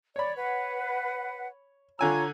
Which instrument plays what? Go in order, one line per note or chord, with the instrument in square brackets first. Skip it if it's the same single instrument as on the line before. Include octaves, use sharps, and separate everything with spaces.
[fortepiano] C#5 B5 [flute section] D5
[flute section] B4 F#5
[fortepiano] D3 G#5 E6 [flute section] F4 C#5 A#5